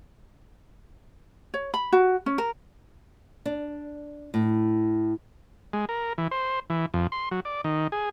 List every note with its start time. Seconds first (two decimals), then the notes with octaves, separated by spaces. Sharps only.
1.54 C#5
1.74 B5
1.92 F#4
2.26 C#4
2.38 A#4
3.46 D4
4.34 A2
5.73 G#3
5.89 A#4
6.18 E3
6.31 C5
6.70 E3
6.94 F2
7.12 C6
7.31 F#3
7.45 D5
7.64 D#3
7.92 G#4